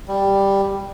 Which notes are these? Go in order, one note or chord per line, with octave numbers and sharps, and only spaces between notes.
G3